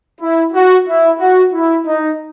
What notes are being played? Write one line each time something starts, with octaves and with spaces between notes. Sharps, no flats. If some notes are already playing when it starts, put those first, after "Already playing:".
E4
F#4
E4
F#4
E4
D#4